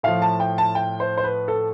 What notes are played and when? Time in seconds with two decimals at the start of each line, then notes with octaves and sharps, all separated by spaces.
0.03 A2 F3 F5
0.22 A5
0.40 G5
0.58 A5
0.75 G5
1.00 C5
1.18 C5
1.24 B4
1.48 A4